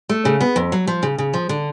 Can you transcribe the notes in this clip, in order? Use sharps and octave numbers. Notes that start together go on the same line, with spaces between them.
A3
C#3
B3
F2
F#3
F3
C#3
C#3
F3
D3